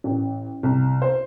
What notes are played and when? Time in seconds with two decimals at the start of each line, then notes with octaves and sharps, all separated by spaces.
0.04 A1
0.63 C2
1.02 C5